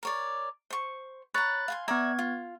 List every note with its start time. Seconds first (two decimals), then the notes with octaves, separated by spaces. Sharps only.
0.03 A#4 C#5 D5
0.70 C5 C#6
1.34 C#5 A#5 B5 F#6 A6
1.68 F5 G#5 C6
1.88 B3 D5 E5 A#5 G#6
2.19 F4